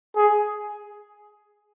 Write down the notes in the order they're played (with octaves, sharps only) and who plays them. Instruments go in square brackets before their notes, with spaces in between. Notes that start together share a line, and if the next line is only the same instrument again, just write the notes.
[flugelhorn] G#4